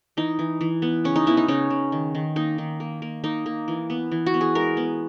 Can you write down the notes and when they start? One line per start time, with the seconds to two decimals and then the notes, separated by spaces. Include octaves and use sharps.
0.17 E3 D#4
0.39 E3
0.61 E3
0.82 B3
1.04 C#3 C#4
1.16 D#4
1.27 B3 E4
1.37 D#4
1.48 C#3 C#4
1.70 C#3
1.92 D#3
2.15 D#3
2.36 A#3 D#4
2.58 D#3
2.80 A#3
3.02 A#3
3.24 A#3 D#4
3.46 A#3
3.68 E3
3.90 B3
4.12 E3
4.26 F#4
4.34 B3
4.41 G#4
4.55 G#3 A#4
4.77 B3